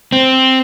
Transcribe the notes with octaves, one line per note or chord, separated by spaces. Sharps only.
C4